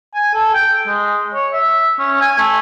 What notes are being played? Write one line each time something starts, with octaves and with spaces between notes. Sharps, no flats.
G#5
A4
G5
G#3
C#5
E5
C#4
G#5
A3